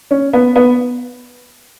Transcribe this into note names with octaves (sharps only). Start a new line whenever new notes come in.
C#4
B3
B3